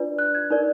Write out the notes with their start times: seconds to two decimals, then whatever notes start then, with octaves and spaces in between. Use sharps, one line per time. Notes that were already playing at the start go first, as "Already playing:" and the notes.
Already playing: D4 F4 B4 D5
0.19 F#6
0.35 G#6
0.50 D#4 A#4 D5